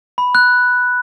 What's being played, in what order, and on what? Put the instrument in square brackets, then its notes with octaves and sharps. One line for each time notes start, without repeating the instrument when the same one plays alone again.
[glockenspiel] B5
F#6